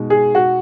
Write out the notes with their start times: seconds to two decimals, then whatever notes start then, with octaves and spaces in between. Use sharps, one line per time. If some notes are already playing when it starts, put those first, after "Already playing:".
Already playing: B2 G#3 D#4
0.10 G#4
0.35 F#4